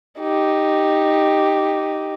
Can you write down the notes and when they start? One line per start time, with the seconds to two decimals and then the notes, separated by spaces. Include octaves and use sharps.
0.20 D#4 G4